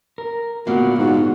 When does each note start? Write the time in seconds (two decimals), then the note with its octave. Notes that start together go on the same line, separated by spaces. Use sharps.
0.18 A#4
0.67 A#2 D3 B3 F#4 F5
0.99 G#2 F#4